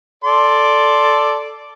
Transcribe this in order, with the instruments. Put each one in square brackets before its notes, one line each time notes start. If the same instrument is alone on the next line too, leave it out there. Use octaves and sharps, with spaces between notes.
[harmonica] A4 D5 C6